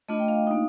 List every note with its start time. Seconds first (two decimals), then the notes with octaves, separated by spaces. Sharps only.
0.09 A3 D4 F4 D#5
0.19 G5
0.28 F5
0.47 A#3 D#4